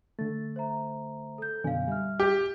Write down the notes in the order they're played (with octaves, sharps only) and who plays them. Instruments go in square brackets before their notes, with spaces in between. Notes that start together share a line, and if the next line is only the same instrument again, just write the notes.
[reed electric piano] D3 A3 [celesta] A6
[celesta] C5 E5 A#5
A4 G6
[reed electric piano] F#2 B2 D3 [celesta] F5 G#5
[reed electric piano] G3 [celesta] E5 F6
[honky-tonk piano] G4